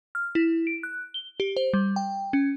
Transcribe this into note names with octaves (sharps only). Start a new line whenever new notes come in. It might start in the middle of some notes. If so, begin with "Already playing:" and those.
F6
E4
D7
F#6
G7
G4
C5
G3
G5
C#4